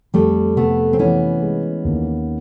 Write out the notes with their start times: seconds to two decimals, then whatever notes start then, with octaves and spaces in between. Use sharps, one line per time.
0.14 F2 G3 A3
0.56 C3 A3 B3
0.93 C4
0.99 E3 B3 C#4
1.42 G#3
1.85 D#2